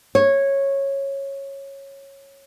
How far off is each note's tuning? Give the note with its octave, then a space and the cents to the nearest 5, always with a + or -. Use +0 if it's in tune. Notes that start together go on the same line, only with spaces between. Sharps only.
C#5 -10